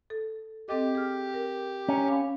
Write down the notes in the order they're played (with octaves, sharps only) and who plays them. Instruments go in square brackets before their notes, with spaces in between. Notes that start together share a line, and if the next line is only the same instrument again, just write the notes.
[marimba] A4
[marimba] C4 A4 D#5 [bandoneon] G4
[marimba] G#4 F6
A#4
[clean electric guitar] C#4 [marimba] A#5
[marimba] F5 B5